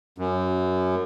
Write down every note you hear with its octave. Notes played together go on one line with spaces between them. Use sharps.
F#2